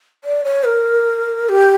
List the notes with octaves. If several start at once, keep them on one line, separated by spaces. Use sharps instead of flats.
D5
C#5
A#4
G4